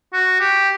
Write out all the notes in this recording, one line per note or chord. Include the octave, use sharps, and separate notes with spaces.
F#4
G4